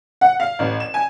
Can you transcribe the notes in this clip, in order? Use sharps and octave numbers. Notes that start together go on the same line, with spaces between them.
F#5
F5
A1
E7
G#5